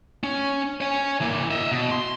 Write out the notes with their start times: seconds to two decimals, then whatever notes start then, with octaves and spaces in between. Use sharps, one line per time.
0.24 C#4
0.81 C#5 G#5
1.21 E3 A#3
1.51 D#5 E5
1.72 B2
1.91 C6